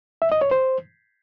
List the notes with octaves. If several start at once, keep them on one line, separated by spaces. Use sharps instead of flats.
E5
D#5
C#5
C5